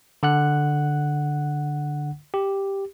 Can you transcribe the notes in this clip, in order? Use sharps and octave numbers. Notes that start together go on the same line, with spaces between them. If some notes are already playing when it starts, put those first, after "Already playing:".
D3 F#5 F#6
G4